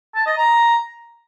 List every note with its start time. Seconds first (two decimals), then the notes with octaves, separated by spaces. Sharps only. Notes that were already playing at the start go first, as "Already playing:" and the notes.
0.15 A5
0.26 D#5
0.37 A#5